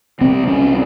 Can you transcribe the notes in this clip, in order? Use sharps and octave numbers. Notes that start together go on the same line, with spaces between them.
C2 C3 C4
C#4